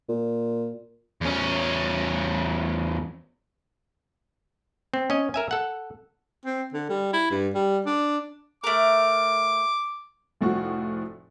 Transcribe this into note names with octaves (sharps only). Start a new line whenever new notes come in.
A#2
E2 C#4
C4
C#4 D#5
A#4 E5 G#5
A4 F#5
C4
D3
G3
E4
G2
G3
D4
A3 A#4 D6
F1 A2 F3 F#4 C#6